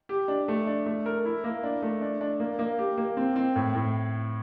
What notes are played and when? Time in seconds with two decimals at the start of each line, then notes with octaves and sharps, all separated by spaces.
0.09 G4
0.28 D4
0.48 A3
0.67 D4
0.86 A3
1.06 A#4
1.25 E4
1.44 A#3
1.63 D4
1.82 A3
2.01 D4
2.21 D4
2.40 A#3
2.59 A#3
2.79 G4
2.97 A#3
3.17 C4
3.36 C4
3.56 A2
3.75 A2